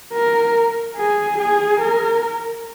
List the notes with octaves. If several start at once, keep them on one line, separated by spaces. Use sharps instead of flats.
A#4
G#4
G#4
A#4